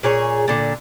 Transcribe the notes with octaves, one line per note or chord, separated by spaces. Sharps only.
A#2 G#4 C#5
A#2 D3